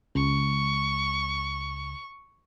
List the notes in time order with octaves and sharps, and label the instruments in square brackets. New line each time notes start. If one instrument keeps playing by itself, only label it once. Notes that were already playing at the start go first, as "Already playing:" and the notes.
[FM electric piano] C#2 [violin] C#6